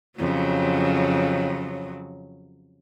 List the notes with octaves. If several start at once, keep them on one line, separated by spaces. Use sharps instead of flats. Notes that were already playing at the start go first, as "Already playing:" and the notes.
F2 C#3 F#3